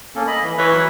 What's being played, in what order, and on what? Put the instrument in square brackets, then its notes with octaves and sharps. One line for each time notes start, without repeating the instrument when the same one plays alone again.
[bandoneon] A#3 C#4 A4
D#5 B5
E3
[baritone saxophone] E3 [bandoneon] B4 C#5 E5
[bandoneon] F#3 E4 B4